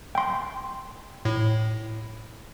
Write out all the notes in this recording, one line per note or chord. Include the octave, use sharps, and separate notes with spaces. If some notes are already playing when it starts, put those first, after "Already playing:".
G5 C6
A2